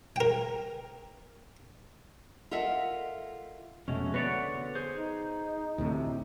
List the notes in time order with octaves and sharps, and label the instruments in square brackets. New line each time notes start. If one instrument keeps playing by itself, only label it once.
[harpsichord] A#4 G5
[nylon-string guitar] F4 A4 A#4 D#5 E5 F#5
[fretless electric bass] F1 [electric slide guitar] B2 G#3 C#4 [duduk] A3
[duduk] D3 [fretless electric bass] B3 [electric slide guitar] F#4 C#5 D5
[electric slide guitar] G#4 C5
[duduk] D#4
[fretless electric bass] D2 A2 C3